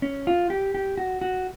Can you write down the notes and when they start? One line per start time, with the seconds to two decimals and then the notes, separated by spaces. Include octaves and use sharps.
0.02 C#4
0.27 F4
0.50 G4
0.75 G4
0.98 F#4
1.21 F#4